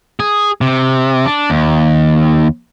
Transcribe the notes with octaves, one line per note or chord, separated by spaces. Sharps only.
G#4
C3
D4
D#2